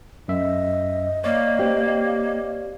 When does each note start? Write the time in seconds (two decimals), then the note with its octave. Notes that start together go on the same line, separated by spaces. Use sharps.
0.28 F#2 D#5 E5
1.24 A#3 C#5 D5 F5
1.59 C4 G4